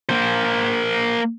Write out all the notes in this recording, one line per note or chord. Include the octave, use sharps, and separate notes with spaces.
A#3 C5